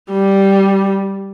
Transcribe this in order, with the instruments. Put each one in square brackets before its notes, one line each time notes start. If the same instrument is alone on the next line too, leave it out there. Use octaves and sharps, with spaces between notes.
[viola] G3